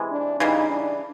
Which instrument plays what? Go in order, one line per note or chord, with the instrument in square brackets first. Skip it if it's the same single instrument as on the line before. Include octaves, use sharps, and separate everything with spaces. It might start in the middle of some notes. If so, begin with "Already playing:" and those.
Already playing: [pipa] C3 E3 G#3
[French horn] D4
[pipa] C#3 E3 G3 [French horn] D#4
[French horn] D4